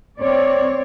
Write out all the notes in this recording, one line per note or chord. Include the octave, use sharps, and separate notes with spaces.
C4 C#5 D5